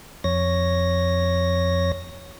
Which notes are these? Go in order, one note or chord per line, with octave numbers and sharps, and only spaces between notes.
F2 C#5 A#6